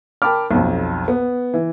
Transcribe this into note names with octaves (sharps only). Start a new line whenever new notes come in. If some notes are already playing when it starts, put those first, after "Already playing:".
A#4 G5 A5 B5 D6 F6
B1 F2
B3
E3